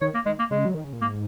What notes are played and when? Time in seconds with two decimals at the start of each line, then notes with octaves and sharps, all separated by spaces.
0.01 D#3 C#5
0.14 A#3
0.26 D#3 G#3
0.39 A#3
0.51 C#3 G#3
0.65 F#3
0.75 D#3
0.84 C#3
0.93 A#2
1.01 G#2 A#3